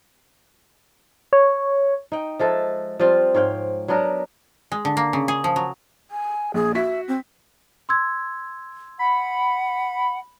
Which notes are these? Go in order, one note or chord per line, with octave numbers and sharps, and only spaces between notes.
C#5
D#4 G5
F3 G#3 A4 E5
F3 G3 C4 F4
G#2 C#5 F5 G5
F#3 B3 D4 A#4
G#3
D3
A#3
C#3
G#4
F3
F#3
G#5
A#1 G#4
F#4 E5 B6
C4
C6 E6 G#6
F#5 B5